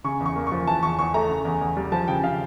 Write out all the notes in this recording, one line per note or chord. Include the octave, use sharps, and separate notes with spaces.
C#3 C#6
E2
C#6
A#3
F3 C#6
E3 A5
E2 C#6
E2 C#6
A3 A#5
C#3
E2
E2
G3
F3 A5
C#3 G5
C#3 F5